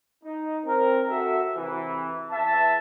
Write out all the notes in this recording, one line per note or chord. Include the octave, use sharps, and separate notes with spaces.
D#4
C4 A#4
F#4 A4 E5
C3 E3
E2 E5 A5